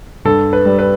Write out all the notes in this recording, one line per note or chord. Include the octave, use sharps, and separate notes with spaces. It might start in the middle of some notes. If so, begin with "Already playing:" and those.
G2 A4
B4
G3
B4